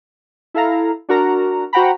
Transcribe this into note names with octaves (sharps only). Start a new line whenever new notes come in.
E4 A4 F5 A#5
D4 F#4 A#4 A#5
F#4 C5 F#5 G5 A#5 B5